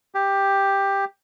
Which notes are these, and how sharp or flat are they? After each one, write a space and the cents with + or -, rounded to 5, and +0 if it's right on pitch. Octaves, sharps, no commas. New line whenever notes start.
G4 +5